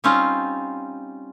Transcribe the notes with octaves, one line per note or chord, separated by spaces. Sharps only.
G3 C4 C#4 D#4 F4